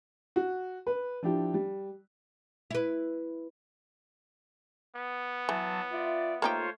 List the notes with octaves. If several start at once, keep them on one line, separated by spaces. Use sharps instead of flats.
F#4
B4
F3 D4 E4 G4
G3
E4 B4
B3
E3 F#3 A5
F4 D5 E5
A3 A#3 D#4 F4 G4 C5 C#5